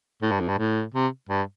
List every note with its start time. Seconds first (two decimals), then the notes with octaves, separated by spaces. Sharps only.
0.22 A2
0.31 G2
0.40 F2
0.48 G2
0.58 A2
0.94 C3
1.29 G2